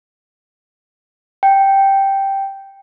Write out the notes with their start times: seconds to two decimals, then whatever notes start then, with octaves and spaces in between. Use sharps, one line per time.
1.43 G5